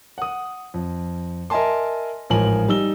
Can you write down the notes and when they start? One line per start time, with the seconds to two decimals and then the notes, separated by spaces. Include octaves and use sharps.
0.18 F#5 D#6
0.74 F2
1.50 A#4 D#5 E5 G#5 A5 C6
2.30 A1 G#2 F3 A#4 G#5 F#7
2.68 G3 D#4 E6 G7